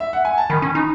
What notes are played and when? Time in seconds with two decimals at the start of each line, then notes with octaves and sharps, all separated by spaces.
0.00 E5
0.13 F#5
0.25 G#5
0.38 A5
0.50 D#3 B5
0.62 C#4
0.75 D#4